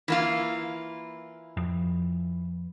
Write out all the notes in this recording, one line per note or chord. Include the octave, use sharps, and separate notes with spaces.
E3 A#3 F4
F2